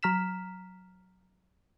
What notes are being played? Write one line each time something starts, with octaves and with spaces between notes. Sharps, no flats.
F#3 A#5 F6 B6 E7